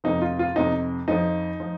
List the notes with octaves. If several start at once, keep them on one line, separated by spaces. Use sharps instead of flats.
F2 C3 F3 D#4
F4
F4
F2 C3 F3 D#4
F2 F3 D#4
F3